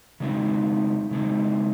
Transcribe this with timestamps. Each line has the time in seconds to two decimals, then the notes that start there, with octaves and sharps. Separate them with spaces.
0.20 C#3 G#3 C4 D#4
1.11 C#3 G#3 C4 D#4